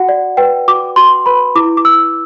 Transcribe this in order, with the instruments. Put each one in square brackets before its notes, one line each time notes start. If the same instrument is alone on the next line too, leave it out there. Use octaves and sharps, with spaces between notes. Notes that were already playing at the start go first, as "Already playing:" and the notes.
Already playing: [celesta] F#4 F#5
D5
B4 G5
F#4 D6
F#4 C6
B4 B5
E4 D6
D6
E4 E6